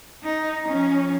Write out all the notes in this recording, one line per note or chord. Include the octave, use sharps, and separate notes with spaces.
D#4
F3 C#4